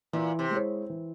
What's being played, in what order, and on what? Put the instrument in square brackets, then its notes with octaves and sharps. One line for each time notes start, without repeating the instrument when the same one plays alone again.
[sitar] A#2 [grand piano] E3
[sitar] C3
[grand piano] G#3 E4 G#4 C#5
E3